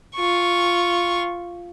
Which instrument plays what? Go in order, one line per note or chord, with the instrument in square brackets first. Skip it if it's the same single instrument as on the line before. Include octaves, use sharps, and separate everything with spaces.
[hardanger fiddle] F4 C#6